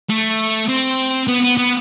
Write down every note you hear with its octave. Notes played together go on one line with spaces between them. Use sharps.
A3
C4
B3
B3
B3